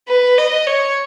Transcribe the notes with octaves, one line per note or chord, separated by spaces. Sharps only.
B4
D#5
C#5